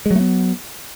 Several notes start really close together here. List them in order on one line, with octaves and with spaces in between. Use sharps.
G#3 F#3 A3 B3